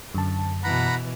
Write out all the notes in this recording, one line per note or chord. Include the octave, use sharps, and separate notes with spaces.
F#2 D3 A5
B2 E3 F#5 A#5 B5